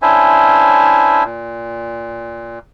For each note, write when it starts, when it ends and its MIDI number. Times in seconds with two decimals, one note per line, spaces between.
0.02 1.24 61
0.02 1.24 62
0.02 1.24 64
0.02 1.24 72
0.02 1.24 76
0.02 1.24 80
1.24 2.59 46